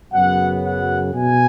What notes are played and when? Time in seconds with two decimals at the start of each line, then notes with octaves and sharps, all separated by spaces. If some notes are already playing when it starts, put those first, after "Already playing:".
0.12 F#2 C#3 F#3 B3 F#5
0.63 F#5
1.14 B2 G#5